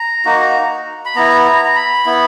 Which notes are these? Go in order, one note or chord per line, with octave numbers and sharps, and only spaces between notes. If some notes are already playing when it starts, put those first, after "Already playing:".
Already playing: A#5
A#3 D#4 F#4
B5
B3 E4 A#5
A#5
A#5
B5
B3 E4